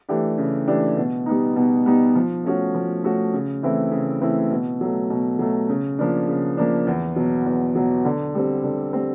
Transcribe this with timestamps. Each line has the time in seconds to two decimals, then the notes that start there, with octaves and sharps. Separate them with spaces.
0.08 E3 A3 D4 G4
0.38 C#3
0.68 E3 A3 D4 G4
0.97 B2
1.26 G3 B3 D#4
1.56 B2
1.86 G3 B3 D#4
2.15 F3
2.44 A3 C#4 F#4
2.74 F3
3.04 A3 C#4 F#4
3.33 C#3
3.63 E3 A3 C4 E4
3.92 C#3
4.21 E3 A3 C4 E4
4.51 B2
4.81 F#3 A3
5.10 B2
5.39 F#3 A3
5.69 C#3
5.99 F3 A#3 D4
6.28 C#3
6.57 F3 A#3 D4
6.87 E2
7.16 B2 F#3
7.46 E2
7.75 B2 F#3
8.05 D3
8.35 G3 C4
8.64 D3
8.93 G3 C4